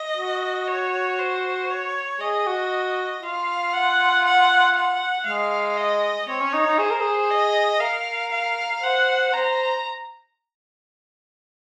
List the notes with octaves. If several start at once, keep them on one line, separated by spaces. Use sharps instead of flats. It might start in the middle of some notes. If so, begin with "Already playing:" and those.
Already playing: D#5
F#4
C#5
C5
C#5
G#4 D#5
F#4
F4 F5
F#5
F#5
F#5
G#3 F5
D#5
C4 C#5
C#4
D#4
D#4
G#4 C5
A#4
G#4
D#5
A#4 F5
F5
C5 F#5
C5 A#5